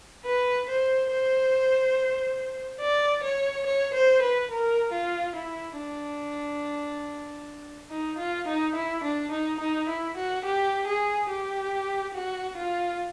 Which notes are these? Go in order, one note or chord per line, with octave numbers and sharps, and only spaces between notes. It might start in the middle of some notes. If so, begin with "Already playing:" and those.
B4
C5
C5
D5
C#5
C#5
C5
B4
A#4
F4
E4
D4
D#4
F4
D#4
E4
D4
D#4
D#4
E4
F#4
G4
G#4
G4
F#4
F4